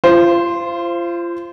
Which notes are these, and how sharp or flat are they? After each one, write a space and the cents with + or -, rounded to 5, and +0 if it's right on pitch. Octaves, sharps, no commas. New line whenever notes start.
F4 -30 C5 +0